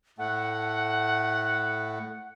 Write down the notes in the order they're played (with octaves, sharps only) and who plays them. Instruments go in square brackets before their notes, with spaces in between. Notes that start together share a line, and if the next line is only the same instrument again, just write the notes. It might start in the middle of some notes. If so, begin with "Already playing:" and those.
[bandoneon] A2 A3 [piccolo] F#5